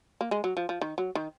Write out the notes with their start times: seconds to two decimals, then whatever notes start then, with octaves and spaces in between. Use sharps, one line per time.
0.21 A#3
0.31 G#3
0.44 F#3
0.57 F3
0.69 F3
0.81 D#3
0.98 F#3
1.15 D#3